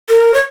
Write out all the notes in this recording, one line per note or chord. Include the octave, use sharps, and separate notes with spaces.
A#4
C#5